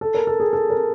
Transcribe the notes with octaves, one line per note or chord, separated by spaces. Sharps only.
A4
A#4
A4
G#4
A4
A#4